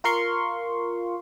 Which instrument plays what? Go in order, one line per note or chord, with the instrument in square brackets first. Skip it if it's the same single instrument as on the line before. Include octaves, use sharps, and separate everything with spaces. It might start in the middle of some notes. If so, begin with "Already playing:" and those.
[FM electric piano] F4 A#4 F5 C6 C#6